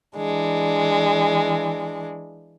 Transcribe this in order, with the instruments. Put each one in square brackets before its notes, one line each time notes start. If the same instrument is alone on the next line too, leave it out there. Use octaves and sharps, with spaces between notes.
[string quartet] E3 G#3 D4